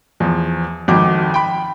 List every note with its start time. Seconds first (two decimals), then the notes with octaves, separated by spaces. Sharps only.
0.20 E2 F3
0.88 G#1 F2 F#4 D6
1.34 G5 B5